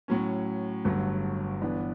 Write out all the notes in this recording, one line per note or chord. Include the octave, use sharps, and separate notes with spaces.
A2 F#3 C#4
G1 G2 F#3 A3
G1 G2 E3 B3 D4